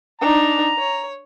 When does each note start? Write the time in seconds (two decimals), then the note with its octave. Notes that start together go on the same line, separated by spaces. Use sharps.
0.21 D4 D#4 A#5
0.79 C#5